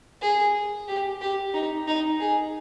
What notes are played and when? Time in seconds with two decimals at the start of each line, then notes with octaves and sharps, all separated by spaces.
0.22 G#4
0.88 G4
1.21 G4
1.54 D#4
1.87 D#4
2.20 G#4